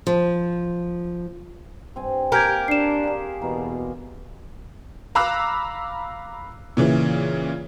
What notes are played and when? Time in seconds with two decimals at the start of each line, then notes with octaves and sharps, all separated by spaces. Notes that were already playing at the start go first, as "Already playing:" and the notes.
0.07 F3
1.96 G2 C4 G#5
2.32 A#3 G4 A#4 G#5 G6 G#6
2.68 D4 C7 E7
3.03 A#3 G#4
3.42 E2 B2 A#3
5.15 F5 A#5 B5 D6 E6 F#6
6.77 A#2 C#3 E3